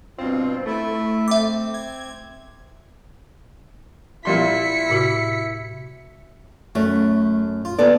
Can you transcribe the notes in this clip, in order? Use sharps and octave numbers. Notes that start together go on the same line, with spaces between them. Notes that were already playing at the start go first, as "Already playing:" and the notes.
G2 B2 C4 F4
A3 E4 E5
C4 E5 D6
G#6
A#2 G3 E4 C6 B6 C#7
A2 C3 F#4
F#2 A3
F4
B3 A4 D5